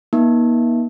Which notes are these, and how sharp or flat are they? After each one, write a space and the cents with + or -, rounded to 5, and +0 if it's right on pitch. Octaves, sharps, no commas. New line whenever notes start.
A#3 +45 D#4 +30